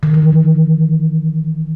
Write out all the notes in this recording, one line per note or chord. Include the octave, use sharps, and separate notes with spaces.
D#3
E3